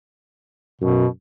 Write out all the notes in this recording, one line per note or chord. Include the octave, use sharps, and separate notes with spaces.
F#2 B2